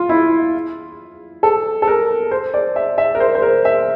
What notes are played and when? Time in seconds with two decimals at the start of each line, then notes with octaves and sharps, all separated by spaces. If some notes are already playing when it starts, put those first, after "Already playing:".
Already playing: F4
0.09 E4
1.43 A4
1.82 A4
1.87 A#4
2.31 C5
2.54 D5
2.76 E5
2.98 E5
3.15 A#4
3.20 C5
3.35 C5
3.42 A#4
3.65 E5